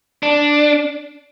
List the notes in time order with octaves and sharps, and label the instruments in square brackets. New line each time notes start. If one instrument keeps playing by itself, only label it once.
[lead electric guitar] D4